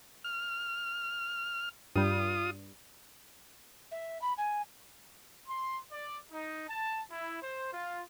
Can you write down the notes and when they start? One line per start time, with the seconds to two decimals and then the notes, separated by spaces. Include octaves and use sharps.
0.24 F6
1.96 G2 G3 F4 D#6
3.91 E5
4.21 B5
4.37 G#5
5.48 C6
5.91 D5
6.31 D#4
6.68 A5
7.10 E4
7.42 C5
7.73 F4